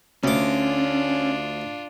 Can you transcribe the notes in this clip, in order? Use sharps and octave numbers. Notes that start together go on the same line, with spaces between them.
D2 C#4 D4 F4 D6